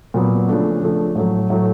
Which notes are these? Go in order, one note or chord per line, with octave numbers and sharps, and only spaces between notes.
A#2 F#3 B3
C#3 F3 A3 D4
C#3 F3 A3 D4
A2 F#3 A3
A2 F#3 A3